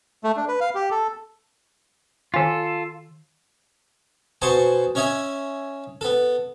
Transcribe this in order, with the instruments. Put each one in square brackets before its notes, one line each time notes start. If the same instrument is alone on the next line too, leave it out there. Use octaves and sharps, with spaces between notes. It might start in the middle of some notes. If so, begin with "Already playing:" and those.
[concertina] A3
D4
B4
F5
G4
A4
[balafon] D#3 G#5 [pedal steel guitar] F4 A4
[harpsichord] B2 C5 G#5 A5 C#6 D#6
C#4 C#5 D#5 E5 G#5
B3 A4